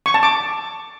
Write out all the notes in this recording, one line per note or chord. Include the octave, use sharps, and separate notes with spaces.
C#6
A5
D6